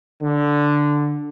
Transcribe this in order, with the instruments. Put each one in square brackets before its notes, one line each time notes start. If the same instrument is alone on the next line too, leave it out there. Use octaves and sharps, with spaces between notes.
[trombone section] D3